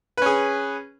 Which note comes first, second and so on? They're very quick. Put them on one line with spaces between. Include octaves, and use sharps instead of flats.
B4 C#4 G#4